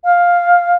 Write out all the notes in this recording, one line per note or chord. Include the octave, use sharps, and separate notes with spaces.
F5